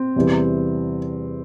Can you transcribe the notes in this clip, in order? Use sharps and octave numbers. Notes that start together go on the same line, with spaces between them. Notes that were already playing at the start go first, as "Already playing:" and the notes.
Already playing: C4
E2 C3 E3 G3